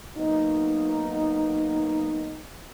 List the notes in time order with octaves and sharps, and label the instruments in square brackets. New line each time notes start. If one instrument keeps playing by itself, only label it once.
[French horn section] F#3 A#3 B3 D#4